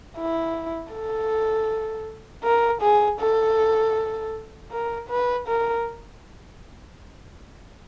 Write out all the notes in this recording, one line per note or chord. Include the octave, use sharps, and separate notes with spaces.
E4
A4
A#4
G#4
A4
A#4
B4
A#4